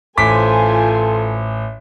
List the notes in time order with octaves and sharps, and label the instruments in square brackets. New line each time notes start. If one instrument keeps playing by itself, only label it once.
[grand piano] A1 D6 B6 [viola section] F4 C5 G#5 [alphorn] A4